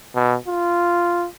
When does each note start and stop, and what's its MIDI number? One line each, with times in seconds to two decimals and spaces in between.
0.15 0.36 47
0.48 1.26 65